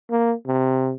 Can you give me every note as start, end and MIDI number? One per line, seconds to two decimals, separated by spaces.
0.11 0.33 58
0.47 0.94 48